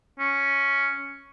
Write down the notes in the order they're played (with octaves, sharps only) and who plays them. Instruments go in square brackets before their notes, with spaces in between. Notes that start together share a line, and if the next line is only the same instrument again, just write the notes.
[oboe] C#4